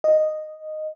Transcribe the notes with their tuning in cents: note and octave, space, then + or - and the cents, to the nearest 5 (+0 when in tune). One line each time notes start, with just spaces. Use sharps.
D#5 -5